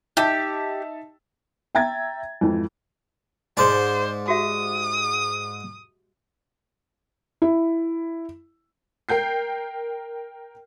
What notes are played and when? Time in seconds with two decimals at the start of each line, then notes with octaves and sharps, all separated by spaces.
0.17 D#4 G4 E5 A5
1.75 E5 G5 A#5 G#6 A6
2.41 F2 G#2 E3 F3
3.57 G#2 D#4 C5 D5 C6
4.28 F#4 G4 E5 D#6
7.42 E4
9.09 A#4 G5 G6 C7